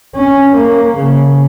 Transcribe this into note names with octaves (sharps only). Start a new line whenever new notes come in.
C#4
A#3
C#3